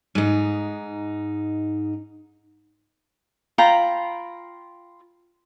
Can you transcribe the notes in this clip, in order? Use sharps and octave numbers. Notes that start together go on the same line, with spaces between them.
G#2 D#4
F4 G5 A#5 B5